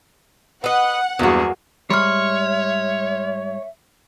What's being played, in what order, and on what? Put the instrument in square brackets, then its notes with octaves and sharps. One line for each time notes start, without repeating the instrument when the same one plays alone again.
[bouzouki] B4 D#5 [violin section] F#5
[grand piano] E2 G2 [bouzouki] F#3 A#3 [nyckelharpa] F#4 G#4
[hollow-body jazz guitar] G#2 G3 [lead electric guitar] C#5 [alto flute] E5 [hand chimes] C6 F6